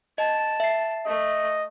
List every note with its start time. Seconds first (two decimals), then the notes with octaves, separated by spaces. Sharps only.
0.18 D#5 A5
0.60 E5 C7
1.07 A3 D#5